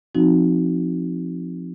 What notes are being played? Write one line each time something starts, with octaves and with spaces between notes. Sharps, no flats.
F3 C4 D#4 F#4